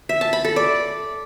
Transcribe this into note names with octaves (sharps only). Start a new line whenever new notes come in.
E5
A5
B5
A4
D5